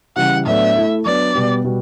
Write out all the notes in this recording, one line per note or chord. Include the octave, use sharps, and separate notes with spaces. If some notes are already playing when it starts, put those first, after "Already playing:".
C#3 E3 G3 F#5
A2 F#3 B3 D4 A4 E5
A3 E4 A4
F#3 B3 D4 D5
B2 G3 B3
B2 G3 B3 F#4